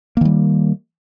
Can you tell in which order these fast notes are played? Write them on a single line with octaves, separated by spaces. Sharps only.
A#3 D#3 G3